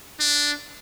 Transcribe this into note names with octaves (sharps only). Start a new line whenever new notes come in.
D4